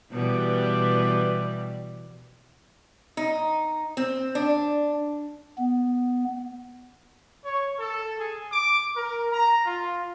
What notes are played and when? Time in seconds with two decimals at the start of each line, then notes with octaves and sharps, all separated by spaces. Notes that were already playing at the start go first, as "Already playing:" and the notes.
0.11 B2 E3 G3
3.17 D#4
3.97 C4
4.35 D4
5.58 B3
7.44 C#5
7.79 A4
8.19 G#4
8.52 D6
8.95 A#4
9.32 A#5
9.65 F4